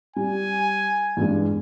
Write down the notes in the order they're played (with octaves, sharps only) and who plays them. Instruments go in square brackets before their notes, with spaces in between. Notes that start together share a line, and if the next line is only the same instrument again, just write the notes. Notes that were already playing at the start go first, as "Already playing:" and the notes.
[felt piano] G3 [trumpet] G#5
[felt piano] E2 G2 G#3